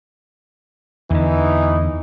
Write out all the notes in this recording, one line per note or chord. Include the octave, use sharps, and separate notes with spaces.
E2 D3 E3 D#4